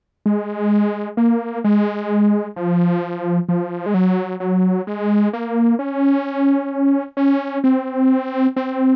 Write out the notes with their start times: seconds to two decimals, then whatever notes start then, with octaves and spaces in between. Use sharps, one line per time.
0.26 G#3
1.17 A#3
1.64 G#3
2.56 F3
3.49 F3
3.86 G#3
3.94 F#3
4.40 F#3
4.87 G#3
5.33 A#3
5.79 C#4
7.17 C#4
7.64 C4
8.56 C4